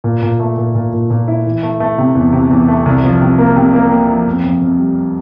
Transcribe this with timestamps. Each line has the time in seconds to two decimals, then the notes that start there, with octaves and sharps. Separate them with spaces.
0.04 A#2
0.23 A#2
0.40 A3
0.57 A#2
0.75 A#2
0.93 A#2
1.10 A#2
1.28 E4
1.46 E3
1.63 A3
1.80 A3
1.98 C3
2.15 E2
2.33 C3
2.51 E2
2.68 A3
2.86 C2
3.03 F3
3.21 C3
3.38 A#3
3.56 C3
3.74 A#3
3.91 A#3
4.09 F3
4.27 F2
4.44 F2
4.61 F2
4.79 G3